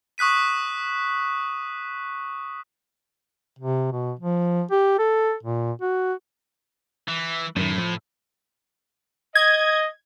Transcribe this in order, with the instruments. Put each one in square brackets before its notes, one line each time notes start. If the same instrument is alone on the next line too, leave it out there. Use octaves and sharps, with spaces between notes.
[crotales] C#6 D#6 F#6 B6 D#7
[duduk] C3
B2
F3
G4
A4
A#2
F#4
[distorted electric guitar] E3
[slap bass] F#2 D#3 [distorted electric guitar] A2
[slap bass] F3
[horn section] D#5 [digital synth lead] G#6